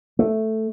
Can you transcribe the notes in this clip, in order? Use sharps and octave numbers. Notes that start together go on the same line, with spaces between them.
A3